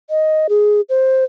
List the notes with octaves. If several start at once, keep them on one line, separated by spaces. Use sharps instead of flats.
D#5
G#4
C5